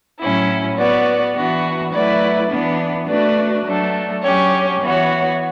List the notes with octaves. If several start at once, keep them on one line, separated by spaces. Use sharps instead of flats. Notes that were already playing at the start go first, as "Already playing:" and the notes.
A2 F#3 C#4 E4
B3 F#4 B4 D5
E3 B3 D4 F#4
F#3 A3 E4 B4 D5
E3 B3 D4
A3 D4 F#4 B4 D5
F#3 A3 D4
F#3 C#4 G4 C#5
E3 B3 F#4 C#5